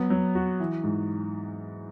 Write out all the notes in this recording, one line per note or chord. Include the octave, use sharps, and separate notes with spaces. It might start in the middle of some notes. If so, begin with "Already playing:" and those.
Already playing: F#3 B3
F#3
F#4
E3
G#2